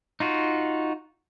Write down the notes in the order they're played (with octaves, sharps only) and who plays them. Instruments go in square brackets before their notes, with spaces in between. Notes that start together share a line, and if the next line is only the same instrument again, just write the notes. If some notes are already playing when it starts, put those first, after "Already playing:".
[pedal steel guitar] D#4 F4 F#4